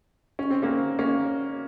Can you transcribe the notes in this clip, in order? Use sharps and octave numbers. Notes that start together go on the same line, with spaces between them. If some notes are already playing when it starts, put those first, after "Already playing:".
C#4
C4
A#3 C#4
A#3 C#4